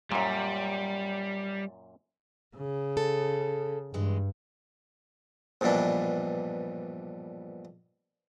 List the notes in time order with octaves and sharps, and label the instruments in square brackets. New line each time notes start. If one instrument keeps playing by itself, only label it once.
[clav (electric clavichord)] F#2 A#2 [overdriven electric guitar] G3
[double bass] C#3
[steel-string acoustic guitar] A4
[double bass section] G2 [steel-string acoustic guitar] E3 G#3
[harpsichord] A#1 G2 B2 E3 D4